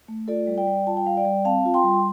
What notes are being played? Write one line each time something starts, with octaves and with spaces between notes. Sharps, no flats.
A3
F4 A4 D5
G3
D5 G5
G3
F4 A5
G5
G3 F5
D5 G5
G3
C4 F5 A5
F4
G5 C6
G3